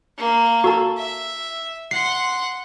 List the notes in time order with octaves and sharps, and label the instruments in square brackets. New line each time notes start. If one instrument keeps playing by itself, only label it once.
[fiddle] A#3
[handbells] F#4 A4 A5
[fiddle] E5
[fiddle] F#5 C6 [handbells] C7